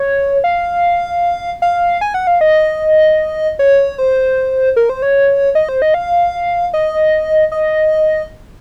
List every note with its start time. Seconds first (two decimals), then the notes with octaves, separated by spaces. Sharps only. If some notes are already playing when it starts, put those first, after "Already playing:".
Already playing: C#5
0.44 F5
1.62 F5
2.01 G#5
2.14 F#5
2.27 F5
2.41 D#5
3.59 C#5
3.98 C5
4.76 A#4
4.89 C5
5.02 C#5
5.55 D#5
5.69 C5
5.82 D#5
5.94 F5
6.74 D#5
7.52 D#5